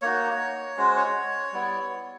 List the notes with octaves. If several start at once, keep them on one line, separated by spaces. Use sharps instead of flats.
A#3 D#4 F#4 C#5
G#3 C#4 F#4 C5
C#5
G3 B3 E4